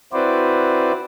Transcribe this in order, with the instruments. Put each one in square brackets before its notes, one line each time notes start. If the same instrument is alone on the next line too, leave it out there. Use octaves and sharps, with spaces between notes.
[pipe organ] C4 E4 F#4 B4 C5 D5